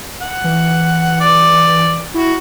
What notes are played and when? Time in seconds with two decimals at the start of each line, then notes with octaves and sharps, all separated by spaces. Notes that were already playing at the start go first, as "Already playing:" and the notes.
0.21 F#5
0.44 E3
1.20 D5
2.14 E4 F#4